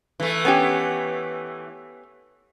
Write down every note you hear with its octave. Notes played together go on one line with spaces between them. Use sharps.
E3 A3
B3 C#4 G4